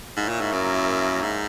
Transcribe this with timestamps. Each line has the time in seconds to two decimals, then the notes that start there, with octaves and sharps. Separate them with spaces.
0.17 G#2 A#3 E4 A#4 C#5 E5
0.29 A#2
0.41 G#2
0.53 F#2
1.22 G#2